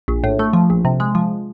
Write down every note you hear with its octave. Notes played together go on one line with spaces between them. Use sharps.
A#1
A2
A3
F3
A#1
C3
G#3
F3